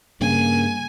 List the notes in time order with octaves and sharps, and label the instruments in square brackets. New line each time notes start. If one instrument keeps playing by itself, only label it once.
[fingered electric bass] G2 C#3 [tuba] A#3 [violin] G#5